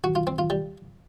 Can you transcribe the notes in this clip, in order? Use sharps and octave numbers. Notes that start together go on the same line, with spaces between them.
F#4
F4
C4
F4
G3